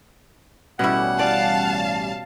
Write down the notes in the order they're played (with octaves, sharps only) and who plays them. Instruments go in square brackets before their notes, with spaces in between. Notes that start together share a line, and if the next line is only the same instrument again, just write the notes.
[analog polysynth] A1 G3 C#4 [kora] B2 E4 [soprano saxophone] F#5
[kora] D5 [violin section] F5 A5